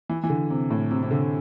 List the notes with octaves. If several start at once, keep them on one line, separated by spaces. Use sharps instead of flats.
E3
E3
D3
C3
A2
C3
C3
D3